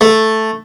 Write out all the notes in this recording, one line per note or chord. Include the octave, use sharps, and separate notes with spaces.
A3